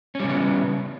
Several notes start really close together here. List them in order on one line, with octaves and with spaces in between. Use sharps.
C#4 G3 C#3 B3